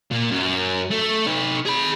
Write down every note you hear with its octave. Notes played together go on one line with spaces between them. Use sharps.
A#2
F#2
A3
D#4 B4
G#4 B5